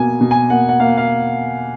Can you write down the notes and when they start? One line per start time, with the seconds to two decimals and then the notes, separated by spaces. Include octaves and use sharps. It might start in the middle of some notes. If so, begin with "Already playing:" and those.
Already playing: B2 A#3 G#5
0.21 B2
0.31 G#5
0.50 A#3 F#5
0.69 F#5
0.79 A#3 F5
0.97 F5